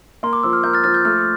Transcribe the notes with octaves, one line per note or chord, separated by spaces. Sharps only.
A#3 C6
D6
F3 E6
F6
A#3 G6
F6 A6
F3 F6 A6
G6
A3 F6